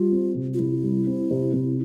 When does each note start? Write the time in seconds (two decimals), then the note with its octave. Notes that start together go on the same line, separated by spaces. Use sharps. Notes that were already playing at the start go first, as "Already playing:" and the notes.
Already playing: G3 F4
0.12 C4
0.35 C3
0.54 F4
0.59 C3 E4
0.83 G3
1.07 C4
1.31 C3
1.54 C3